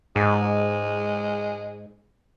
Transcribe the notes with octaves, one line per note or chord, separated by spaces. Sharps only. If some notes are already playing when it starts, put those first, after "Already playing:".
G#2 G#3